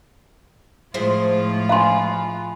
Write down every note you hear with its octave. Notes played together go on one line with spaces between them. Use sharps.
A2 F3 G#3 E4 F4 C5
B4 F5 G#5 C6